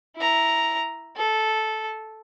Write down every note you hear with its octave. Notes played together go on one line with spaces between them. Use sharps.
E4 A#5
A4